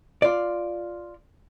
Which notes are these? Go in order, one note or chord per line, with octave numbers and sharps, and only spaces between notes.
F4 D5